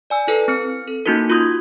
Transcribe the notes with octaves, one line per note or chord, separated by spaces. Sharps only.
D5 G#5 E6
E4 A4 B4
C4 F6 C#7
A4
A#3 C#4 D#4 E4 F#4 A#4
F4 F#4 C6 D#6 G6 G#6